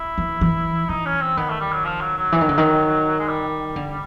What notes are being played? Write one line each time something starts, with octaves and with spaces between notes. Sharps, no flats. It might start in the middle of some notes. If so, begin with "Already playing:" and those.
Already playing: E4
E3
E3
E3 D#4
C#4
C4
D#3 B3
A3
G3
F#3
F3
F#3
F#3
E3
D#3
D3
D#3
G#3
G3
D3